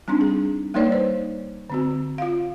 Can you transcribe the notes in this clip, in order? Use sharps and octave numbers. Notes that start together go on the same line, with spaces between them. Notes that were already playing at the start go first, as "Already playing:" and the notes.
G3 C4 D4 D#4
G#4
G3 A#3 D#4 B4 C#5 D5
C5
D3 C4 F#4
F4 F5